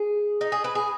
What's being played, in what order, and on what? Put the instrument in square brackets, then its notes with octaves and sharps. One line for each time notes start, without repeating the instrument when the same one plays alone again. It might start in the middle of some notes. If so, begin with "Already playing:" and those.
Already playing: [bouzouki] G#4
D#4
G#4
B4
G#4